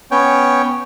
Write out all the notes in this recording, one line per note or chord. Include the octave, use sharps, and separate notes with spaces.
B3 C#4 C#5 G5